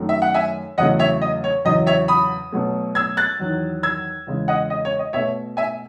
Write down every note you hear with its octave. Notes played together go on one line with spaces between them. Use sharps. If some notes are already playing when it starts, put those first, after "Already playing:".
Already playing: F#2 D#3 A3
E5
F#5
E5 G#5
E2 C#3 F#3 A3 D#5 F#5
C#5 E5
D#5
C#5
E2 C#3 F#3 D#5
C#5 E5
B5 D#6
B2 F#3 A3
E6 G#6
F#6 A6
E2 D#3 F#3
E6 G#6
E2 C#3 G#3
D#5 F#5
D#5
C#5
D#5
B2 A3 C#5 E5
E5 G#5